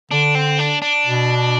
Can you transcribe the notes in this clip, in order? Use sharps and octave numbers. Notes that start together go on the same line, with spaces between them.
D3 D4
C4
D4
D4
B2